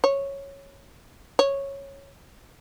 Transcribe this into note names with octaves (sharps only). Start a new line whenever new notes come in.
C#5
C#5